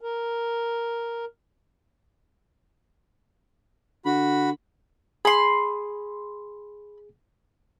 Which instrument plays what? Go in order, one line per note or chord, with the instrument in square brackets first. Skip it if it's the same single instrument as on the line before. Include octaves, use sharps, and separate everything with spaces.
[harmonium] A#4
[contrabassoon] D3 [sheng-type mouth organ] F#4 B5
[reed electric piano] G#4 [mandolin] B5 C6